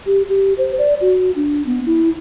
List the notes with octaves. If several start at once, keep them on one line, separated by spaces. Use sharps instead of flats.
G4
G4
C5
D5
F#4
D4
B3
E4